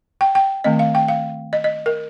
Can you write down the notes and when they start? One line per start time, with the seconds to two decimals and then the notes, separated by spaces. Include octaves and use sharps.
0.21 G5
0.35 G5
0.64 D#3 A3 C4 D#5
0.79 F5
0.95 G5
1.08 F5
1.53 D#5
1.64 D#5
1.86 A#4